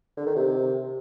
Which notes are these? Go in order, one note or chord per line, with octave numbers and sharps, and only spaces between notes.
D3
D#3
C3